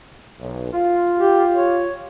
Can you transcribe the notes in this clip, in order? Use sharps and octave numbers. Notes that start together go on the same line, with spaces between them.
B1
F4
G4
C#5